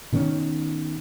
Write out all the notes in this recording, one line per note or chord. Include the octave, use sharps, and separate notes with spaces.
B2 D#3 C4 C#4